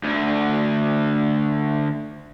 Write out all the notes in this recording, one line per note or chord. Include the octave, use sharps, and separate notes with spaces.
D2 D3